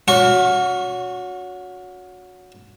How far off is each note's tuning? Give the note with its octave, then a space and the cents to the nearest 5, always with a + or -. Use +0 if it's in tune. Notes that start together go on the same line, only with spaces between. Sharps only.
C#4 +25 F#4 -20 C#6 -30